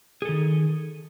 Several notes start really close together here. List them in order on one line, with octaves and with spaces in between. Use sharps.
G#4 A4 D#3